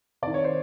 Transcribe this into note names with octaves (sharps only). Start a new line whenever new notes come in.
C3 D#3 D5
C#5
C5